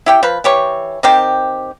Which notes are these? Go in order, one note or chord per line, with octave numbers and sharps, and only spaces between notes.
E4 G4 G5
F3 B4
E3 G4 C#5
D#3 C4 G4